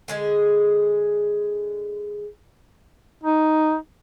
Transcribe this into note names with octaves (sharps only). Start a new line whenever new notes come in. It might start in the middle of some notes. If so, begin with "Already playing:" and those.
D3 G#3 G#4
D#4